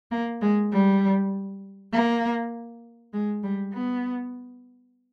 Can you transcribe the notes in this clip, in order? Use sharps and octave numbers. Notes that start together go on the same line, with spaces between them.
A#3
G#3
G3
A#3
G#3
G3
B3